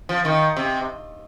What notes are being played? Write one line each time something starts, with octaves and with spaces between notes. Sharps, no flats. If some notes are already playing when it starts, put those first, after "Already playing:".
F3
D#3
C3